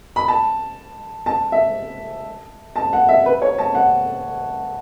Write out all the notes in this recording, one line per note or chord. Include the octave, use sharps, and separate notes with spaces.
B5
A5
A5
E5
A5
F#5
E5
B4
C#5
A5
F#5